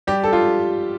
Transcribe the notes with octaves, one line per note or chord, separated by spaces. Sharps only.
G3 G4
A4
F4